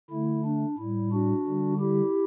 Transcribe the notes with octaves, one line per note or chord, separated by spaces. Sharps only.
D3 A3 E4
D4
A2 G3 E4
D4 F#4
D3 G3
E4 G4